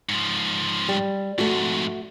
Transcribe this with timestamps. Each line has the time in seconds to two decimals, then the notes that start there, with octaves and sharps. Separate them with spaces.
0.09 G#2 F3
0.89 G3
1.39 F2 G#2 A3 F#4